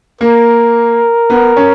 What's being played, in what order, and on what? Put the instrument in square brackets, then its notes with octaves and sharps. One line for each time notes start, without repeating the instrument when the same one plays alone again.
[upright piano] A#3 [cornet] A#4
[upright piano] B3
C#4